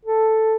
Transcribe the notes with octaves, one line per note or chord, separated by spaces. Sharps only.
A4